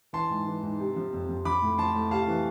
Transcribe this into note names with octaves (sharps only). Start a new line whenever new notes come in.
E3 A5 C6
G#2
E3
G#2
C3
F3
F2
F2
F3 B5 D6
A2
F3 A5 C6
A2
C3 F5 A5
E3